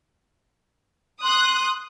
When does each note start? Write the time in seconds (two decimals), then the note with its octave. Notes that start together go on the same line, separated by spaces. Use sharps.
1.23 C6 D#6 F#6